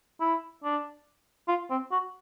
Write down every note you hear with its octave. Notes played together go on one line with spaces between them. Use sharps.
E4
D4
F4
C4
F#4